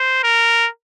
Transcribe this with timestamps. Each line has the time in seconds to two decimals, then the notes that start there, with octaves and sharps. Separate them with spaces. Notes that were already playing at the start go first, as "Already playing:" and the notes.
Already playing: C5
0.23 A#4